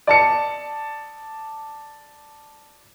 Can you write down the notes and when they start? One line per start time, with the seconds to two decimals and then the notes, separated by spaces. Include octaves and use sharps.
0.07 D5 A5 C#7